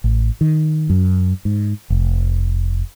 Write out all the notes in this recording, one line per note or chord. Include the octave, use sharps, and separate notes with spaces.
A1
D#3
F#2
G#2
F1